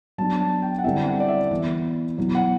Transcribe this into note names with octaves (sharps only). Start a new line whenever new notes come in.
F#3 B3 D4 A5
A5
G5
F#5
D3 G3 C4 E4 E5
F#5
D5
E5
E3 B3 E4
B2 F#3 B3 E4
F#5